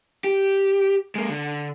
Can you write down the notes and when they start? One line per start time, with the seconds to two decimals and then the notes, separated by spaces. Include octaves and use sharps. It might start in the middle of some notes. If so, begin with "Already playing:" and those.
0.24 G4
1.15 G#3 A#3
1.29 D3